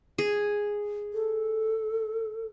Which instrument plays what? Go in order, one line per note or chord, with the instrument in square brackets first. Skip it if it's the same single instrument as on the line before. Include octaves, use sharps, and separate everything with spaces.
[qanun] G#4
[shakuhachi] A4